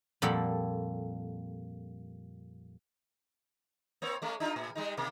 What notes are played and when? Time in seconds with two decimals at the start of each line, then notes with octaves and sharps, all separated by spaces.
0.22 F2 A#2 G3 A#3 A4 F#5
4.02 A#3 C4 C#5
4.22 G#3 A3 C#4
4.40 D4 D#4 F4
4.56 A2
4.75 G3 G#3 D#4
4.97 B2 A#3